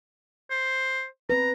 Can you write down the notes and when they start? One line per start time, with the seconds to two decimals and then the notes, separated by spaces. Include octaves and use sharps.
0.51 C5
1.30 C4 B4 A#5